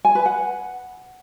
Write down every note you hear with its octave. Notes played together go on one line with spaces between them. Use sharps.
G#5
B4
F#5